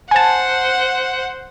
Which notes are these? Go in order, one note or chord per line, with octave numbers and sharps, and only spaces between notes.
C5 F#5 G#5 A5